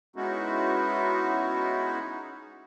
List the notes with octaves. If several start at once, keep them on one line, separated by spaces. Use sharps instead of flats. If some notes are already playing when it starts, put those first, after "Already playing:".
G#3 B3 C#4 D#4 E4 F#4